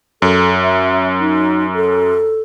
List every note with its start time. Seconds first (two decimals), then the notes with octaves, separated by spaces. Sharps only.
0.22 F#2 A4
0.62 E5
1.20 D#4
1.75 A4